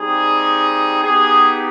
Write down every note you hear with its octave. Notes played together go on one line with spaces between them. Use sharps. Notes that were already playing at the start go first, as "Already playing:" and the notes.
Already playing: G3 C4 D#4 G4 G#4
B3 D#4 G4 G#4